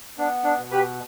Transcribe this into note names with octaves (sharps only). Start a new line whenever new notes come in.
B3 D4
D4
B2
G4 B4